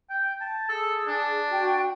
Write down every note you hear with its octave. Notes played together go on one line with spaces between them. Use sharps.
G5
A5
G#4 A4
D4
F#4 G5